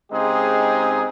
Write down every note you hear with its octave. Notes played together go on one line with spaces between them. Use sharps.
C#3 G#3 C4 D#4 G4 G#4